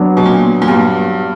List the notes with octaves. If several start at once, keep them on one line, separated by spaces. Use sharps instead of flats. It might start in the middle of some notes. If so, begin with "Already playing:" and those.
Already playing: F#3 B3 D4
B2
A#2
A#2
G2